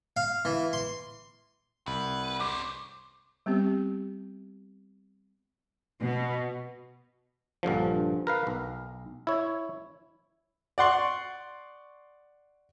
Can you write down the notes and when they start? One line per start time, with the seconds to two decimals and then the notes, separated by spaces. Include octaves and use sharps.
0.17 F5
0.45 E3
0.73 C6
1.87 C2 B4
2.40 C#4 C5 D6
3.46 G3 B3 C4 G4
6.01 B2
7.63 A#1 G2 D3 F3
8.27 A#4 B4 F5
8.47 B1
9.27 E4 C#5
10.78 D5 F#5 C6 C#6